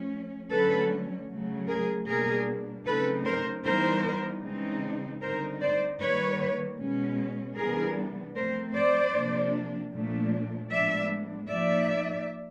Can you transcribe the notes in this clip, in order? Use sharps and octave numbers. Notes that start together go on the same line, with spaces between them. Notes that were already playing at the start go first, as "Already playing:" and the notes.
Already playing: F3 A3 C#4
D3 F#3 A3 C#4 A4 B4
C#3 F#3 A3
G#4 A#4
B2 G3 A#3 D4 G#4 A#4
C#3 F#3 A3 C4 D#4 A4 B4
A#4 C5
E3 G3 B3 D#4 A#4 C5
C#3 E3 G#3 C4 D#4
D3 G3 C4 D#4 A#4 C5
C5 D5
D#3 G3 A#3 B4 C#5
B2 G#3 C#4
C3 E3 G3 B3 D4 G#4 A#4
F3 A3 C4 A#4 C5
C5 D5
C3 F3 A#3 D4
A#2 F3 A3 D4
A2 F3 G#3 B3 D4 D5 E5
F3 A#3 D#4 D5 E5